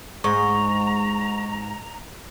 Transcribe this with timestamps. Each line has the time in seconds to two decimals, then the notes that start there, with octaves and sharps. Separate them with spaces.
0.24 G#2 A#5 C#6